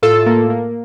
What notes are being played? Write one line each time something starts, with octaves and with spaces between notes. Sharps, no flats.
A2 F4 A4
A#3
A#3